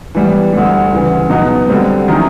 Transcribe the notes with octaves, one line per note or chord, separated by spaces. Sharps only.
E3 G3 B3
D2 D3 G3
D2 C#3 E3
B2 F#3 B3 D#4 F#4
D3 G3 C4
D#3 F#3 A3 C#4 E4